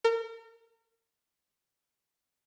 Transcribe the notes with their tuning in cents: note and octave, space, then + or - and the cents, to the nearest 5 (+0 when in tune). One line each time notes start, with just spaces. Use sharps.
A#4 -35